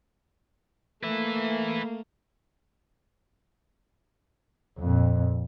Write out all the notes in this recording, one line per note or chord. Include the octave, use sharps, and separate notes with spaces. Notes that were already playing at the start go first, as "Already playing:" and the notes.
A3 A#3 B4 E5
F2 A#2